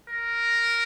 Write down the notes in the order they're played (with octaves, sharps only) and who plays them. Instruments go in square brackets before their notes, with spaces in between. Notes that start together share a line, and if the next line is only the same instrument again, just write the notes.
[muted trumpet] A#4